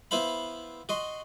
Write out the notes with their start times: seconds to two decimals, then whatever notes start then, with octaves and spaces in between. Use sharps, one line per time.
0.11 B3 E4 C5 F5 B5
0.89 F#4 D#5 C6